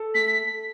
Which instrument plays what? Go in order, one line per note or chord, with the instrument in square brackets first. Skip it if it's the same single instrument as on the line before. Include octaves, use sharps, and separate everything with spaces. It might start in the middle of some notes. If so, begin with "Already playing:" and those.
Already playing: [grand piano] A4
[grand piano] A3 [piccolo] B6
[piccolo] B6